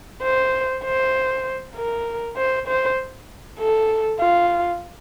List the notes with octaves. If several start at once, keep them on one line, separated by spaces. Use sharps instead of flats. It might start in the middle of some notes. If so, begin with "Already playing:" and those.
C5
C5
A#4
C5
C5
A4
F4